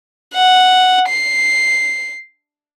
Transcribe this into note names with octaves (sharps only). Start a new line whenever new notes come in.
F#5
C7